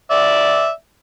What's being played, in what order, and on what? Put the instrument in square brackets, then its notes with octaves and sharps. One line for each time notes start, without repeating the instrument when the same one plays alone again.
[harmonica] D5 E5